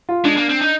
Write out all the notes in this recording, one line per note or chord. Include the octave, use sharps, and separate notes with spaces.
F4
G#3 D4
A#3
C4
D#4